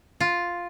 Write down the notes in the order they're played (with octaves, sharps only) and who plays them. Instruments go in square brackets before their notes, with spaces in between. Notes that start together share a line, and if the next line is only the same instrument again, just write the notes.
[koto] F4